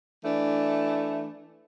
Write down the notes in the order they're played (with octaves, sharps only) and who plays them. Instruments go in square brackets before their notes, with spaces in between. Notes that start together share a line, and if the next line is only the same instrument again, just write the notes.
[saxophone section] E3 A3 D4